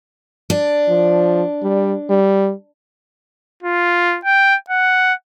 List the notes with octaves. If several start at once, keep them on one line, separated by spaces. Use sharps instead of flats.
D4
F3
G3
G3
F4
G5
F#5